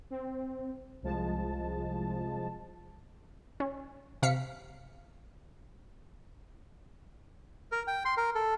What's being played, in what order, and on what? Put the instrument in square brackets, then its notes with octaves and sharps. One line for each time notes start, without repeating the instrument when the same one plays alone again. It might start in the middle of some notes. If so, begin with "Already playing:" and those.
[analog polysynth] C4
C2 F3 G#3 A5
[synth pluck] C#4
C3 F5 B6 C#7
[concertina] A#4
G5
C6
A#4
A4